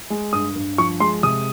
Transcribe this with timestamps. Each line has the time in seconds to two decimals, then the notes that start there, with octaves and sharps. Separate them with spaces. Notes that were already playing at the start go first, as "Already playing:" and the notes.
0.10 G#3
0.33 G2 D#6
0.56 G2
0.78 F3 C#6
1.00 G#3 C6
1.23 C3 D#6